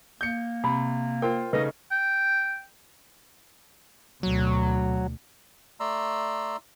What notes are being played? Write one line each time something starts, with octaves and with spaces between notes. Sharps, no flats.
A#3 G6 C#7
C3 B5
F4 A#4 C5 G5
C#3 A3 D#4 B4 D#5
G5
D2 B2 F#3
A3 D5 A#5 C6 E6